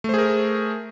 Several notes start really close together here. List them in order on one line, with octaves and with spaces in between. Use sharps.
A3 C5 G#4 A#4